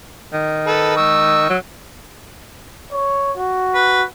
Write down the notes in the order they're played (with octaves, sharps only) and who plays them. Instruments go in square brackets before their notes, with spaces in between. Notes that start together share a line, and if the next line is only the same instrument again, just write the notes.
[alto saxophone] D#3
[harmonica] A4 B4
C#6 E6
[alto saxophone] F#3
[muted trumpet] C#5
F#4
[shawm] B4